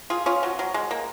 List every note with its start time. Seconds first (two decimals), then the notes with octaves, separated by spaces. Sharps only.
0.10 F4 G#4
0.26 C#4 F4
0.43 F#3
0.59 F#3
0.74 G#3
0.91 A#3